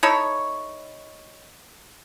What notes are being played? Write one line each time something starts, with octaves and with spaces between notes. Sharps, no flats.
D#4 E4 A4 C#5